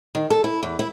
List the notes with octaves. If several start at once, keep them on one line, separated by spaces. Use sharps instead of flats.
D#3
A4
E4
E2
E4